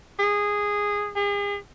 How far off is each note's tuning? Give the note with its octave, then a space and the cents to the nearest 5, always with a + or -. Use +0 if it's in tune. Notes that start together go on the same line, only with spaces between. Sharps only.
G#4 -15
G#4 -40